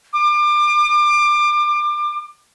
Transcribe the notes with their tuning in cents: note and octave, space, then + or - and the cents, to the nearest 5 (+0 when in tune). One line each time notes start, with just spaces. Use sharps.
D6 +30